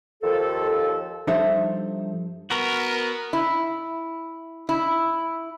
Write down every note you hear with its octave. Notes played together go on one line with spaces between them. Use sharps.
D#2 F3 A4
G2 F3 D#4 A4 C5 E5
B3 F#4 A#4
E4
E4